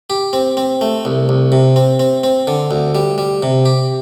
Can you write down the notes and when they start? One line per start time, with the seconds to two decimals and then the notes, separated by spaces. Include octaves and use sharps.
0.10 G4
0.33 C4
0.57 C4
0.81 A3
1.05 C2
1.29 C2
1.52 C3
1.76 C4
1.99 C4
2.24 C4
2.47 D3
2.71 D2
2.95 G3
3.18 G3
3.43 C3
3.66 G4